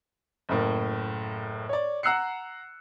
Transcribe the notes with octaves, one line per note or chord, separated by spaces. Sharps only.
F#1 A2 A#3
C#5 D5
F#5 A#5 E6 F#6 C7 C#7